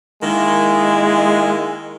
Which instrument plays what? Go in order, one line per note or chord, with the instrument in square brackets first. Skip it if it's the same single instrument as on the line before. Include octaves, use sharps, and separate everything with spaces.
[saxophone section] D#3 A#3 E4 [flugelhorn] G#3